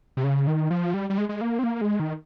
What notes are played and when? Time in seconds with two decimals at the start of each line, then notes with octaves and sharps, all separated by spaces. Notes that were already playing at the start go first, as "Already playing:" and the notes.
0.17 C3
0.24 C#3
0.47 D#3
0.70 F3
0.94 G3
1.10 G3
1.18 G#3
1.29 G#3
1.41 A#3
1.59 C4
1.64 A#3
1.81 G#3
2.00 D#3